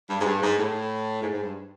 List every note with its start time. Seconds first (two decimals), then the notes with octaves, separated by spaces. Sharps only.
0.09 G2
0.21 G#2
0.25 G2
0.42 G#2
0.58 A2
1.22 G#2
1.33 G#2
1.44 G2